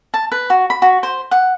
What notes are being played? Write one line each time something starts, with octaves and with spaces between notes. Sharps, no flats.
A5
B4
F#4
B5
F#4
C5
F#5